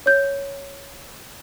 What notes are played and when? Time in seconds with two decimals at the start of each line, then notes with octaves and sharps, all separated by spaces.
0.06 C#5 G6